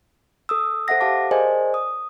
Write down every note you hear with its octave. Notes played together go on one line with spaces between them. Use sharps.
A4 D#6 E6
A4 C5 E5 F#5 A#6
G4 F5 A5 D6
G#4 A#4 C5 D5 D#5 G#5
D#6